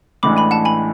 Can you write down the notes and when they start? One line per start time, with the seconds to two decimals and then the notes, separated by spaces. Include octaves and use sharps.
0.23 A1 A2 E3 G#3 D4 B5 D6
0.37 G#5 B5
0.51 F#5 A5
0.65 G#5 B5